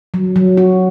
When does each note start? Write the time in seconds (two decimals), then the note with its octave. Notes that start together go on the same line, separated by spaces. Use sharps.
0.14 F#3
0.36 F#3
0.57 F#4